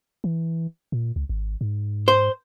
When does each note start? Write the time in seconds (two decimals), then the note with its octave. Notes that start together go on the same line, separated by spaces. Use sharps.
0.24 E3
0.92 A#2
1.16 C#2
1.29 G#1
1.61 G#2
2.08 C5